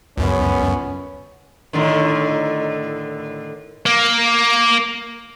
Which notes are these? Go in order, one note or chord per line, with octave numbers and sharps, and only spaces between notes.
C#2 F#2 B3 C#4
A2 D3 D#3
A#3